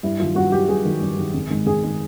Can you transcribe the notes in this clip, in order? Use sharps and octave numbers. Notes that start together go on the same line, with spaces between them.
G2 E4
D#3 F#3 F4
G2 F#4
D#3 F#3 G4
G2 G#4
D#3 F#3
G2
D#3 F#3
G#1
G#2 D#3 G#3
G#1 G#4
D#3 G#3